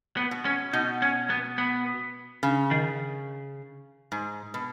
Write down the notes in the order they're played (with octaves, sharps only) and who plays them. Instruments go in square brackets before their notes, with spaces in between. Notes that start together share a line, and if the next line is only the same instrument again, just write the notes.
[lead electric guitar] B3
[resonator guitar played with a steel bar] B2
[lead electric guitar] C#4
[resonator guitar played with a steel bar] B2 [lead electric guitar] D#4
[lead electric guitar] C#4
B3
B3
[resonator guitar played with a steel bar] C#3
[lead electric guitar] D#3
[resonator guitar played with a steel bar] G#2
B2